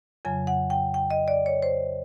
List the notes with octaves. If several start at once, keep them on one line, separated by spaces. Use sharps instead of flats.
F2 C#3 F#3 G#5
F#5
G5
G5
D#5
D5
C#5
C5